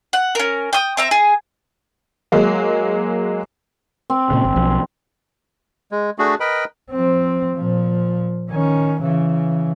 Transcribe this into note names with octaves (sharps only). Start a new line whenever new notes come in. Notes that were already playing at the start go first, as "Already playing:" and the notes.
F#5
C#4 A#4
G5 D#6
C4 E5 A#5
G#4
F#3 G#3 A#3
C4
A#2 C#3
G1
B1 F3
G#3
A3 D4 F#4 G#4
A#4 B4 D#5 G5 B5
F3 C4
A#2 F3
D#3 C#4
C#3 E3